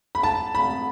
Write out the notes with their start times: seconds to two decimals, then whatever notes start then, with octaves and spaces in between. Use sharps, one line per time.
0.15 B5
0.23 A5
0.55 B5